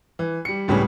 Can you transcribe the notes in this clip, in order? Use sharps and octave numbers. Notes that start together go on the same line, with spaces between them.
E3
G3 C#7
C#2 A2 C#3 G3 B3 C#4